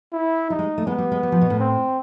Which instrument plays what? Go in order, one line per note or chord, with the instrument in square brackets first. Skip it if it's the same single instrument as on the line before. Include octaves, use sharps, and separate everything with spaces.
[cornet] E4
[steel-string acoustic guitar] G3 [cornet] D#4
[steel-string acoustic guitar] G#3
A3
[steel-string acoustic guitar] G#3 [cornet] B3
[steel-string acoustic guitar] G3
G#3
G3
F3
B2
A2
[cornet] C4